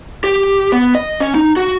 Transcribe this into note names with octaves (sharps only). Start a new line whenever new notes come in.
G4
B3
D#5
C#4
D#4
F#4